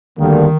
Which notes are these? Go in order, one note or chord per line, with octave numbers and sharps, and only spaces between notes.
D2 D3 D#3 G3 A#3 D4